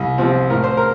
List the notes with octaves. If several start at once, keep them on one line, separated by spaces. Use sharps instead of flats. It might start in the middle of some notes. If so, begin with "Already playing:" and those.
Already playing: C2
C3 F3 C4
A2 A#4
C5
A#4